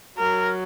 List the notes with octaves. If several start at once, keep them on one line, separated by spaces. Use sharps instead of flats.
F#3 A#4